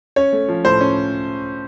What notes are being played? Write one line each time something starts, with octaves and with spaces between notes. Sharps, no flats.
C#4 C#5
A3
F3
A2 C5
C#4